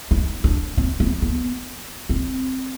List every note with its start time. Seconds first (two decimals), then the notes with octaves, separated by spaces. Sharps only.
0.11 D#4
0.44 D4
0.77 C4
1.00 B3
1.22 B3
2.09 C4